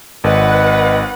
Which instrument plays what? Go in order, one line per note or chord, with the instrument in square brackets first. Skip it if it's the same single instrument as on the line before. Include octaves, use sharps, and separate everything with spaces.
[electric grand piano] G#1 [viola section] B4 F#5 [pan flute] D#5